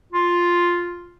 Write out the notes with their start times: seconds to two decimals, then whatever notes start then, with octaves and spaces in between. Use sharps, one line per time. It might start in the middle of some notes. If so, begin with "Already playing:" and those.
0.12 F4